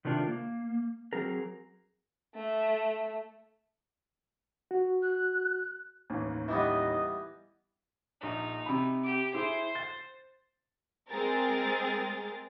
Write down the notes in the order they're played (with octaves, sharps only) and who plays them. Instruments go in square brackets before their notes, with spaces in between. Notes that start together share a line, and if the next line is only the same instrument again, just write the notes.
[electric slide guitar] C3 D#3 A3 D4 F4 A#4
A#3
F#3 C4 G#4 A#4
[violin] A3
[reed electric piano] F#4
[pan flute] F#6
[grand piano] A1 D#2 D#3
[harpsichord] E3 G3 B3 [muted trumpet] D#5
[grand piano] A#1 [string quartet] D#4
[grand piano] C3 B5
[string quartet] G4 D6
[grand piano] E4 G#4 [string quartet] C5
[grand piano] A6
[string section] G#3 C4 G#4 A#4 A6